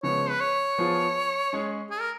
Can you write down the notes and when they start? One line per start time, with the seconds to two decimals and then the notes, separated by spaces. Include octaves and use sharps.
0.03 C#3 F3 G#3 B3 C#5
0.29 B4
0.40 C#5
0.78 F3 B3 F4 G#4
1.53 G#3 C#4 G#4
1.90 G#4
2.00 A#4